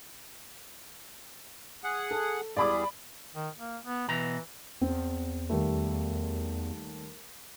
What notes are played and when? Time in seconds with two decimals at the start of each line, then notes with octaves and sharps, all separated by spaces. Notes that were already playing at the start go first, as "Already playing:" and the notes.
1.84 G#4 F#5
2.11 A4
2.57 E2 G3 G#4 D5 B5 D6
3.35 D#3
3.57 A#3
3.84 B3
4.08 B2 E3 A#5
4.81 E2 C4
5.50 D#2 G3 A3